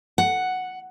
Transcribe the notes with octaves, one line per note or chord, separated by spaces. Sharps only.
F#5